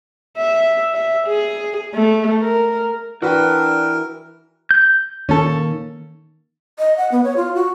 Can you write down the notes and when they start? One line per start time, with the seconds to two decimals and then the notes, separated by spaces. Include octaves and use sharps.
0.38 E5
0.94 E5
1.27 G#4
1.94 A3
2.41 A#4
3.22 E3 D4 F#4 A#4 B4 G5
4.71 G6
5.29 D#3 A#3 C#4 A4
6.79 D#5
6.98 F#5
7.12 B3
7.24 C#5
7.37 F4
7.55 F#4